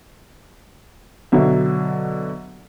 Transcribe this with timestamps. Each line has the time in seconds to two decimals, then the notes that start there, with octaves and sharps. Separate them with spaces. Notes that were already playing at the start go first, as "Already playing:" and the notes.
1.32 B2 D3 F#3 E5